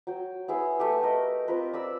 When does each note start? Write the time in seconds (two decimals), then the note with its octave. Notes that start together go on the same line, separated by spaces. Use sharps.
0.07 F#3 G5
0.48 B3 E4 G#4
0.80 A3 G4
1.03 A#4 D#5
1.48 C4 F4 A#4 B4
1.73 D5 B5 E6